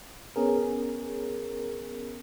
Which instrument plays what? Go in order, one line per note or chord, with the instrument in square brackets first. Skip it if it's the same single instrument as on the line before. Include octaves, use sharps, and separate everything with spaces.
[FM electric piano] B3 C#4 G#4 A#4